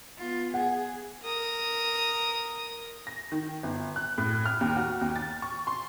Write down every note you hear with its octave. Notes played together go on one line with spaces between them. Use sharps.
B3 F4
G#4 F#5
A#4 D#6
A#6
D#3
G1
F#6
A2
F6
D#2
F#4
D#2
A6
C#6
C6